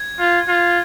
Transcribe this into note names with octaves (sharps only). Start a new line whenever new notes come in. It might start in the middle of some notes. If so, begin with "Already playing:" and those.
Already playing: G#6
F4
F4